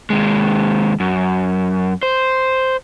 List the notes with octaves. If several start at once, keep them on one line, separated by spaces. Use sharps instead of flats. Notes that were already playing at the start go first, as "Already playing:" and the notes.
D#2 G#3
F#2
C5